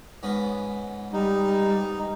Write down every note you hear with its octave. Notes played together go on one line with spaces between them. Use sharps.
G#2 B3 C#4
G3 D#4